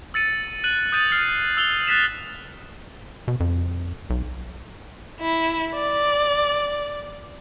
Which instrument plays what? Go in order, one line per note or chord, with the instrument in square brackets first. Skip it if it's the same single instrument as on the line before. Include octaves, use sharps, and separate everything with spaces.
[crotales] E6 A6 C#7 D#7
F#6 D#7 F#7
D#6 G6 A6 D#7
F6 C7
E6 F7 G7
F#6 A6 B6 E7
[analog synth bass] B2
F2
B1
[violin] E4
D5